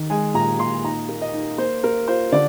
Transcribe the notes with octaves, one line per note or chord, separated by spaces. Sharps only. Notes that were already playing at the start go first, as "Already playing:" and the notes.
Already playing: D#3
G#3 G#5
A#2 A#5
A#2 C6
D#4 A#5
A#3
D#5
D#4
A#3 C5
A#3 A#4
F4 C5
D3 D5